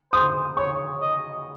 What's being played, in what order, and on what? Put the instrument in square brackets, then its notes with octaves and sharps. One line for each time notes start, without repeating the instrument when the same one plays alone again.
[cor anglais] C5 [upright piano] D#6
[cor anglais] C#5 [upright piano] C#6
[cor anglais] D#5